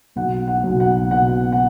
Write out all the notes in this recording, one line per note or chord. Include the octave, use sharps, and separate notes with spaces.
B1 F#5
F#5
B1
F#5
B2 F#5
F#5